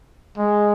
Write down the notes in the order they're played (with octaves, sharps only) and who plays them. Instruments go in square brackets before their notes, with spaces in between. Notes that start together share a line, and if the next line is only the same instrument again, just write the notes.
[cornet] G#3